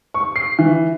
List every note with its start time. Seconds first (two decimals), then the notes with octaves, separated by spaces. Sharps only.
0.14 C#6
0.36 C7
0.59 E3